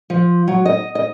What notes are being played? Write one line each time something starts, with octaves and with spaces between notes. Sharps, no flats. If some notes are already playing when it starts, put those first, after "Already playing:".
F3
F#3
D#5
D#5